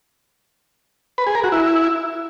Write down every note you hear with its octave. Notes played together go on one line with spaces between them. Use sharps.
B4
G#4
A#4
F#4
E4